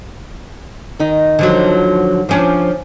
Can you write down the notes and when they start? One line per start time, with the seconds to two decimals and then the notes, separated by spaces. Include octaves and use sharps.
1.00 D#3 D#4
1.39 D3 F3 F#3
2.29 F3 C#4 D4